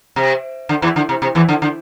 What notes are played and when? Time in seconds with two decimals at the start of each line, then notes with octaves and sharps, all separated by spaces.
0.16 C3
0.69 D3
0.82 E2 E3
0.96 D3
1.09 C3
1.22 C3
1.35 E2 E3
1.49 D3
1.62 D3